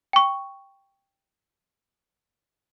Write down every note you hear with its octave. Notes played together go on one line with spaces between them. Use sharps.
G5 C#6